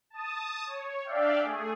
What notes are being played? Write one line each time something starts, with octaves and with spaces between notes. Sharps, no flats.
A5 D#6
C#5
D4 D5 E5 F5 G5
A3 G#4